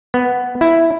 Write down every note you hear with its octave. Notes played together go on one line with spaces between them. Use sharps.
B3
E4